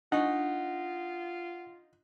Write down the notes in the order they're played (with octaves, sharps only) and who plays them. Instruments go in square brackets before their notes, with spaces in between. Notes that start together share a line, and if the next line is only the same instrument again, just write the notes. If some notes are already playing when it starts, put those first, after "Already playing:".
[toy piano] D4 D#5 C#6 [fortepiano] D#4 [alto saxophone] F4 [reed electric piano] F#5